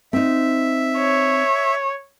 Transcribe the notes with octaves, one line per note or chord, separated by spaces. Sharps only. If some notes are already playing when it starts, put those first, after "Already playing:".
C4 D#4 E5
C#5